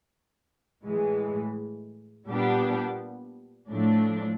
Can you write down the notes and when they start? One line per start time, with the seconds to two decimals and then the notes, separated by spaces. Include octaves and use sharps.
0.84 A2 E3 G#3
2.27 A#2 G3 B3 D4 G4
3.70 A2 F3 A3 D4